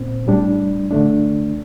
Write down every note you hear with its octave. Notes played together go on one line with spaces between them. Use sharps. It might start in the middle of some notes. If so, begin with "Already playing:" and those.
Already playing: A#2 C4
A2 G3 D4
D3 A3 D4